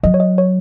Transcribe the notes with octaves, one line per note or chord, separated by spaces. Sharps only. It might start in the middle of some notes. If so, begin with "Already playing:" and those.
F#3 D#5
C#5
D#5
C#5